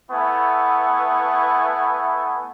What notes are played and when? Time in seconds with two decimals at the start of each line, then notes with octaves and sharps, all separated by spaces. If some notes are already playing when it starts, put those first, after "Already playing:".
0.11 A3 B3 E4 G#5 C#6